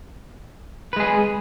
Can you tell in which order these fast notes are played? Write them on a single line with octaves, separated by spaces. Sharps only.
B4 G#3 G#4